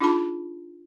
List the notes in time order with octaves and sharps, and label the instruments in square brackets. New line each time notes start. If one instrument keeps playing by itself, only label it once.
[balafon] D4 D#4 F4 G#4 A5 B5